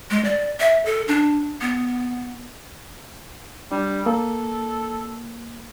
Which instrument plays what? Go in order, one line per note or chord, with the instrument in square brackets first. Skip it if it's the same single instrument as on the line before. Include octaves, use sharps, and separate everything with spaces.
[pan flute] G#3
D5
E5
A4
D4
B3
[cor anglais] G3 [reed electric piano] D4
[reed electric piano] A#3 [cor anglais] A4